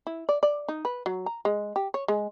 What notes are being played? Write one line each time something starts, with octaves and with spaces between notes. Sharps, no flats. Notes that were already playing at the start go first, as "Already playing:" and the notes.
E4
D5
D5
D#4
B4
F#3
A#5
G#3
G4
C#5
G#3